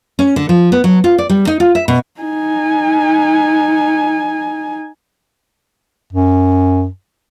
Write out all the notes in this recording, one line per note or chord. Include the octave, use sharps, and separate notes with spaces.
C#4
D3
F3
B3
F#3
F4
D5
G3
D#4
F4
E5
B2
D#4 G#5
F#2